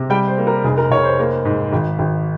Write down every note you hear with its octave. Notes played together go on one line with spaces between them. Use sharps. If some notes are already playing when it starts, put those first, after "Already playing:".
Already playing: C3
G3 G5
C5
A#3
A#4
F1 G#4
A#4
F1 C#5
C5
A#3
G#2
G#1
G#1